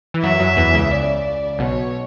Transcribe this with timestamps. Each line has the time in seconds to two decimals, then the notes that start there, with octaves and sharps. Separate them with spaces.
0.14 E3
0.23 F#2 F#3 E5
0.40 F#2 F#3
0.57 E2 E3
0.74 C#2 C#3
0.91 D5
1.59 B1 B2 C#5